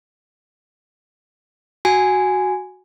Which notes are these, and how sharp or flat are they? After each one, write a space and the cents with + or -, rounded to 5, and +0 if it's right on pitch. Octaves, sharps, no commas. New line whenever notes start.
F#4 +0 G#5 +0